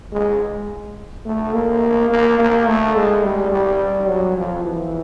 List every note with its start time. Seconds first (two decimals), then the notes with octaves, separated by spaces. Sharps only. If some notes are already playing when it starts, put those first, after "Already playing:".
0.12 G#3
1.25 A3
1.53 A#3
2.10 A#3
2.39 A#3
2.67 A3
2.95 G#3
3.23 G3
3.52 G3
4.08 F#3
4.36 F3
4.64 E3